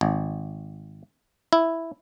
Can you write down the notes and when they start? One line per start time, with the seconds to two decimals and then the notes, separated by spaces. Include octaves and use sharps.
0.01 G#1
1.53 E4